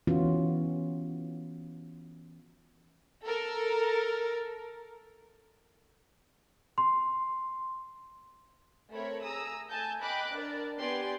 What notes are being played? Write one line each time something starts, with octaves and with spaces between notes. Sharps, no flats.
E3 B3 C#4 F4 F#4
A4 A#4
C6
A3 C4 A#4 C#5 B5
G#4 A#5 D#6 E6
A3 G#5 A5 G6
D#5 G5 B5 D6 F#6
D4 A#4 D5
B3 G4 D5 G#5 C6 C7